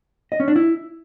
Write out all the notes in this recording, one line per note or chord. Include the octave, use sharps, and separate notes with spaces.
D#5
C#4
D4
E4